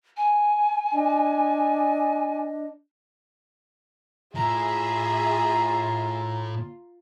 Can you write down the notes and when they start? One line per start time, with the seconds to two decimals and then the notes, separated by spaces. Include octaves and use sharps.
0.17 G#5
0.94 D4 D#5
4.35 A2 F4 G#4 E5 A#5